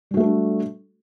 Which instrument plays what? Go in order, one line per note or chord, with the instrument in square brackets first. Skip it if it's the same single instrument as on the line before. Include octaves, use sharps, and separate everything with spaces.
[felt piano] G3
F#4
A3
A4
D4